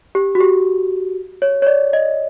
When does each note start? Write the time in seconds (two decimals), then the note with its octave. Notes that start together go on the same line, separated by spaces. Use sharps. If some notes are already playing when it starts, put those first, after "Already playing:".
0.15 G4
0.35 F#4
0.40 G4
1.42 C#5
1.62 C#5
1.67 D5
1.93 D#5